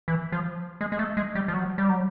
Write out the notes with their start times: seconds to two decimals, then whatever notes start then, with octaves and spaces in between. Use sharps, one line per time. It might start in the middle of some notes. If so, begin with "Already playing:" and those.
0.08 E3
0.32 F3
0.81 G#3
0.92 G#3
0.99 A3
1.17 G#3
1.35 G3
1.48 F3
1.53 F#3
1.78 G3
1.89 F#3